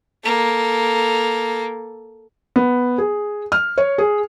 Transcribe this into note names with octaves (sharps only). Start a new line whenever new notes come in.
A#3 A4
B3
G#4
F6
C#5
G#4